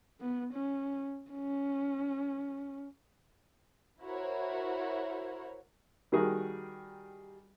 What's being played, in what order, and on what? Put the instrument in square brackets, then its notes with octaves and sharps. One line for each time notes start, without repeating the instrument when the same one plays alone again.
[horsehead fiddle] B3
C#4
C#4
[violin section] E4 F#4 A#4 C5 C#5
[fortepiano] D#3 G3 F#4 G#4 A#4